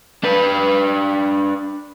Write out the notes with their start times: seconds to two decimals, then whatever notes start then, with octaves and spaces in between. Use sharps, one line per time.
0.24 D4 B4